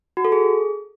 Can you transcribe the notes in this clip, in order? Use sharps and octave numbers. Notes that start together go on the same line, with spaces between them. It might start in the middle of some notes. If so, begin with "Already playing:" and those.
F#4
A4
G#4